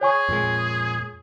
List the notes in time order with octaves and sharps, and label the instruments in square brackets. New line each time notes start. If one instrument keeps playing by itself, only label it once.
[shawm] G#4 [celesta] C#5 G#5 C#6
[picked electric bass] F2 A#2 G#3